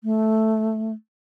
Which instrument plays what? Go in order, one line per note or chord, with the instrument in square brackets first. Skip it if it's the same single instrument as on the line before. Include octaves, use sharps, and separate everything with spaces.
[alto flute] A3